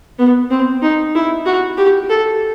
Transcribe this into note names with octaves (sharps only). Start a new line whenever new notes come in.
B3
C4
D#4
E4
F#4
G4
A4